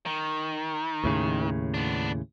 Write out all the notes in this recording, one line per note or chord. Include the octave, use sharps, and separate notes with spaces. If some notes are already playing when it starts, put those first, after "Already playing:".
D#3
D#2 A2 C#3
B3 D4